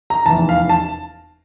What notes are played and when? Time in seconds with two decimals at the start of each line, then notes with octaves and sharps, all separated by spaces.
0.10 A#5
0.26 F1 E2 E3 A5
0.49 F5
0.69 A5